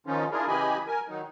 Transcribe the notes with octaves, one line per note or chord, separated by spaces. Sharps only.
D#3 F3 C#4 D#4 F4
D4 E4 F4 G#4 A#4
C#3 E3 G4 D#5 G#5 B5
A#4 G#5
D#3 F#3 D#4